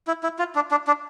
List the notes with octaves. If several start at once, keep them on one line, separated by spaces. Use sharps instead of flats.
E4
E4
F4
D4
D4
D4